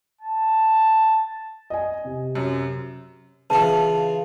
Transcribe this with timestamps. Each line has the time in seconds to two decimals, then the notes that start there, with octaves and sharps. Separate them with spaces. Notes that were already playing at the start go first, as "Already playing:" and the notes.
0.21 A5
1.70 D#5 G#5
2.05 C3
2.35 F#2
3.50 C#3 E3 F4 B4 A5